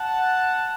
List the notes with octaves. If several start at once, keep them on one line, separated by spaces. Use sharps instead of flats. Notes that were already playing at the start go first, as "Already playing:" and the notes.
Already playing: F#5 A5